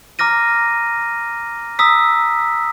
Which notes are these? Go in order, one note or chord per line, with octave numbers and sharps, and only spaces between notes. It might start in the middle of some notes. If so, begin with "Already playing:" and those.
A#5 D6 F6 A#6 D#7
A#5 D#6 E6 B6